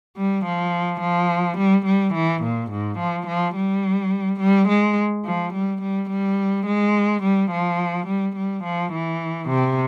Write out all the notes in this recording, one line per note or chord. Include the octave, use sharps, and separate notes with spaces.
G3
F3
F3
G3
G3
E3
A#2
G#2
F3
F3
G3
G3
G#3
F3
G3
G3
G3
G#3
G3
F3
G3
G3
F3
E3
C3